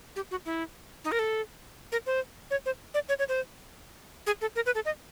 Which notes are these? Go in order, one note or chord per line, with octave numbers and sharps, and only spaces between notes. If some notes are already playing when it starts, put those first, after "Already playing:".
G4
F#4
E4
D#4
A#4
A4
A#4
C5
C#5
C5
D5
C#5
C#5
C5
G#4
A4
A#4
B4
A4
D#5